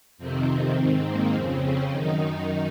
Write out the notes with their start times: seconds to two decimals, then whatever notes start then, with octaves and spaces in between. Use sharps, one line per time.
0.18 F2 C3 D#3 C4
0.76 G#2 D#3 C4
1.05 A#3
1.33 F2 C#3 C4
1.62 C#4
1.92 F#2 D#3 D#4